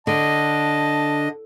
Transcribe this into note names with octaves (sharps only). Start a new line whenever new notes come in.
D3 D#5 A5